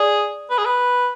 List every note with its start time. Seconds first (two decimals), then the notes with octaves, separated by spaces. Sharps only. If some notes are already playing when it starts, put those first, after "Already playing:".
Already playing: G#4 D5
0.50 B4
0.58 G#4
0.65 B4